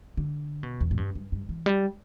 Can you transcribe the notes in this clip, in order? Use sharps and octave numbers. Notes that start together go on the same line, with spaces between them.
D3
B2
E2
A2
G2
G2
G2
E3
G3